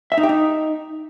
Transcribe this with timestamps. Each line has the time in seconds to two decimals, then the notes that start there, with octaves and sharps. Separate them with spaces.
0.12 E5
0.18 D#4
0.23 G4
0.29 D#4